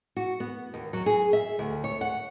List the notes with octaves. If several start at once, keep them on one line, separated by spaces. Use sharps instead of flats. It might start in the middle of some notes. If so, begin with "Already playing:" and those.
F#4
B3
D#2
F#3
G#4
E5
D2
C#5
F#5